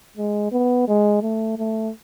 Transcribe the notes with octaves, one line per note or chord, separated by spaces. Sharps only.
G#3
B3
G#3
A3
A3